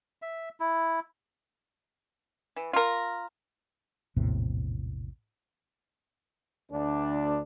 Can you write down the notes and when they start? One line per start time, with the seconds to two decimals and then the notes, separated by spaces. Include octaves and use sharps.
0.22 E5
0.60 E4
2.56 E3
2.73 F4 A#4
4.16 A#1 E2 A2 C3
6.71 D2 D4